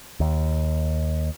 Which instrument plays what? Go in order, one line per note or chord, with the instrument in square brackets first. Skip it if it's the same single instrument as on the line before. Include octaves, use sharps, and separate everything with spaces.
[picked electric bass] D#2